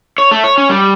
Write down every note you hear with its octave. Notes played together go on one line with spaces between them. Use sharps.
C#5
A3
C#5
C#4
G3